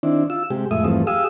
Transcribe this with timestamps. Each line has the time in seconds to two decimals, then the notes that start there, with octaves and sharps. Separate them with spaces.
0.03 D#3 C4 D4 E4
0.30 F4 E6
0.50 C3 G#3 G4
0.71 F2 A2 G#3 E5 D#6
0.85 E2 G2 F3 A3 C4
1.07 G4 G#4 F5 D#6 E6